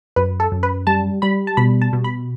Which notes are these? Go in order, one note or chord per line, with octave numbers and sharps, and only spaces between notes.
F#2 B4
A4
F#2
B4
G3 A5
G3 B5
A5
B2 B5
A5
B2
B5